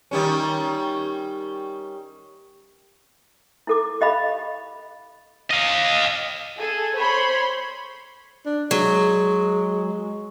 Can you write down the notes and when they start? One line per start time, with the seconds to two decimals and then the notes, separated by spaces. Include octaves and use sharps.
0.11 D#3 G3 C#4
3.67 E4 A4 D6
4.01 G4 D#5 F5 B5
5.51 D#5 F5
6.59 G#4 A4
6.97 C5 C#5 B5 C6
8.46 D4
8.71 F#3 G#3